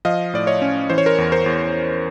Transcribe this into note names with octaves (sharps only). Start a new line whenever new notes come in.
F3 D#5 F5
A2 D5
C#5 D#5
C#4
E3 C5
C#5
A#4 C5
E2
A#4 C5
E2